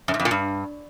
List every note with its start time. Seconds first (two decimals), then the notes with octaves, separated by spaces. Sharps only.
0.08 F#2
0.14 G#2
0.20 F2
0.25 A#2
0.31 G2